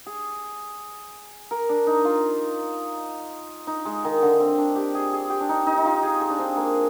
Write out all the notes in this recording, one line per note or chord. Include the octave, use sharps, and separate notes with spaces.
G#4
A#4
D4
D#4
F4
D#4
G#3
D#3
D3
C4
D4
G4
G#4
G#4
G4
D4
D#4
D#4
D#4
F4
G#4
G#4
D4
C4
A#3